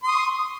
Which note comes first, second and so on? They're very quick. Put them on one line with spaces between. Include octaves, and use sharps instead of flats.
C6 D#6 C#6